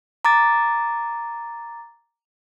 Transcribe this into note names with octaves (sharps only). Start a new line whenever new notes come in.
A#5 D6 A6